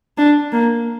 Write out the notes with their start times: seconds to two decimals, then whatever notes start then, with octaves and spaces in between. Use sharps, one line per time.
0.18 D4
0.53 A#3